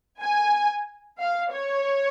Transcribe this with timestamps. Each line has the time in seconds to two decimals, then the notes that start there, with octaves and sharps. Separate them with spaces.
0.21 G#5
1.19 F5
1.51 C#5